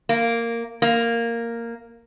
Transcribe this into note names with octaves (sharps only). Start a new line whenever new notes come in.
A#3
A#3